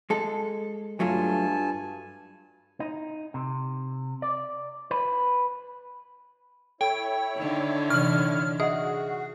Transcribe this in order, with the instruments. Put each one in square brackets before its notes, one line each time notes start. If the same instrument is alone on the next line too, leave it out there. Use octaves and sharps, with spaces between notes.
[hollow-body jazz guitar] G#3 A4
[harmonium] G2 G#5 A5 [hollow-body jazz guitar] F#3 A3 F4
[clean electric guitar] D#4
C3
D5
B4
[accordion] E4 C#5 [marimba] A4 [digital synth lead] G5
[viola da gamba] D3 D#3
[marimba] C3 E3 [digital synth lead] F6
[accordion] F#4 [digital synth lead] G#4 [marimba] D#5 E5